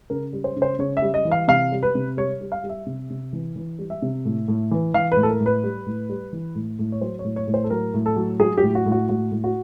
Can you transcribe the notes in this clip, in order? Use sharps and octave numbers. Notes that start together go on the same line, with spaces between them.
C#3 A#4
G3
C5
C#3
C5
C#3 C#5
E5
G3
D#5
E3
F5
C3 F5
G3
B4
C3
G3 C#5
G3
F5
G3
E5
C3
C3
E3
E3
G3
E5
C3
A2
A2
E3
E3 F5
B4
A2
A4
A#4
A2
B4
G3
A2
G3
E3
A2
A2
C#5
F#3 C5
C#5
A2
C#5
A2
C5
A4
F#3 A#4
A2
A4
F#3
F#3 G#4
G4
A2
F#4
A2
F#4
A2 F#4
A2
F#4